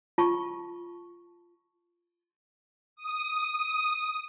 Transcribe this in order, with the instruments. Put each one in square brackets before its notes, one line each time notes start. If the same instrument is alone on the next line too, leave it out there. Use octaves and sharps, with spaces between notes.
[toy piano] F4 A5 C#6
[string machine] D#6